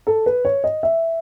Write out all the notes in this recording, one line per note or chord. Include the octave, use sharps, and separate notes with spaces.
A4
B4
C#5
D#5
E5